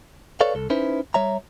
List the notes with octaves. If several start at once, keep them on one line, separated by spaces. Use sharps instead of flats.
A4 B4 C#5 D5 F5
C2 A4
C#4 D#4 E4 B4 C5
G3 C#5 E5 A#5